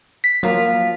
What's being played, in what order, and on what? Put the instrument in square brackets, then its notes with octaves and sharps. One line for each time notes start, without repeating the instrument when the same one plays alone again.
[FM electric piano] B6
[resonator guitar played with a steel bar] F3 F4 [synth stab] F#3 A#3